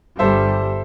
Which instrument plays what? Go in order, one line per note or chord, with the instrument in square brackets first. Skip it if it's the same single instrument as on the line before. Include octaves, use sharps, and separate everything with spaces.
[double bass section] G1 G3 [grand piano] A4 C5 E5